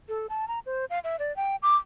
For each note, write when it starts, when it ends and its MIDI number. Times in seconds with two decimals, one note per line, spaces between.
0.09 0.27 69
0.30 0.48 81
0.48 0.59 82
0.66 0.85 72
0.90 0.99 77
1.04 1.19 76
1.19 1.35 74
1.36 1.56 79
1.63 1.76 86